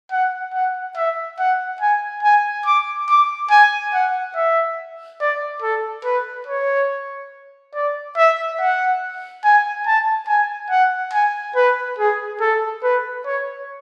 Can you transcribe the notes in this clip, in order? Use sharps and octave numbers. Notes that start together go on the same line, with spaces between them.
F#5
F#5
E5
F#5
G#5
G#5
D6
D6
G#5
F#5
E5
D5
A4
B4
C#5
D5
E5
F#5
G#5
A5
G#5
F#5
G#5
B4
G#4
A4
B4
C#5